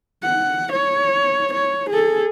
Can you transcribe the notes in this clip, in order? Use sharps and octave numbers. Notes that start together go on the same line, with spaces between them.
F#5
C#5
C#5
G#4 A4